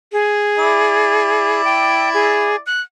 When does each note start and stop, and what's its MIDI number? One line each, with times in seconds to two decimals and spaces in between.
0.13 1.64 68
0.58 2.59 64
0.58 2.59 74
1.64 2.10 79
2.14 2.56 68
2.66 2.81 90